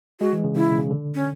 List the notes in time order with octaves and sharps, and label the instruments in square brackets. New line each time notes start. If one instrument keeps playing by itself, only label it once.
[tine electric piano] G#3 [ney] F#4
[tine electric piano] E3
C#3
[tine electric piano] C#3 [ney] E4
[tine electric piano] B2
C#3
D3
[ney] C#4